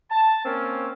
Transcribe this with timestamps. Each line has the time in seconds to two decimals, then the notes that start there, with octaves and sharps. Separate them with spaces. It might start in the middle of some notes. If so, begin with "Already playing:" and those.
0.10 A5
0.45 A#3 C4 C#4